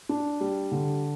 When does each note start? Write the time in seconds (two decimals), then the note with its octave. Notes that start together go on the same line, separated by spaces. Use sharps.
0.09 D4
0.41 G3
0.71 D3